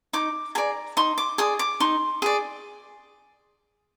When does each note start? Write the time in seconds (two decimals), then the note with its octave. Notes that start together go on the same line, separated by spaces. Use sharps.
0.13 D#4 D6
0.55 G#4 D5 A#5
0.97 D#4 C6
1.18 D6
1.38 G#4 D5 D#6
1.59 D6
1.80 D#4 C6
2.22 G#4 D5